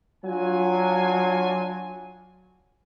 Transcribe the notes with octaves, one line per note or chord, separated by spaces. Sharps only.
F#3 D4 F4 G#5